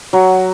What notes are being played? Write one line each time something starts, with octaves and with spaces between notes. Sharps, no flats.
F#3